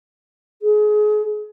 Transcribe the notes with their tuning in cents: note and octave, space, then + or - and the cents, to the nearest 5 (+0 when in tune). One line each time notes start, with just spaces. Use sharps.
G#4 +30